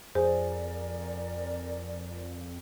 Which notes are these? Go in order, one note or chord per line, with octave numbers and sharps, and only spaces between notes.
F2 G#4 A#4 C5 D5